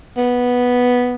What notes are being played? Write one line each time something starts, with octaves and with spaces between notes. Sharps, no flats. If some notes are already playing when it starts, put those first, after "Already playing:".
B3